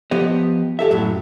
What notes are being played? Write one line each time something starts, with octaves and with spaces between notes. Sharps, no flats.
F3 B3 G4 D#5
E2 G4 A4 E5
F#2 A2 F#3